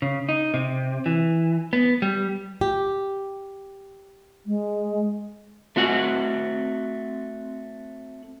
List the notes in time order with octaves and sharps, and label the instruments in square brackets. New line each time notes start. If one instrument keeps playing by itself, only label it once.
[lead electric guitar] C#3
D#4
C3
E3
B3
G3
[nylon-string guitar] G4
[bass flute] G#3
[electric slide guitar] A3 C4 F#4 F#5